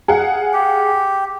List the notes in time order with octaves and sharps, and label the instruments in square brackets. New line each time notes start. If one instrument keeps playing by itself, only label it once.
[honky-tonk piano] G#4 F5 F#5
[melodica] G4